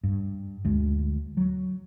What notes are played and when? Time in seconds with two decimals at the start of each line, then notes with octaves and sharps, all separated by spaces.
0.03 G2
0.65 D2 G#3
1.37 F#3